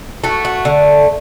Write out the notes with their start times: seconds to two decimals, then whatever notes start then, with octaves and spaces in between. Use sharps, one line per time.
0.24 A3 F#4
0.45 F#4
0.65 D3